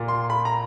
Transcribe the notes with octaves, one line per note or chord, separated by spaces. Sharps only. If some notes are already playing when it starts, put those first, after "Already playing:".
Already playing: A#2
C6
B5
A#5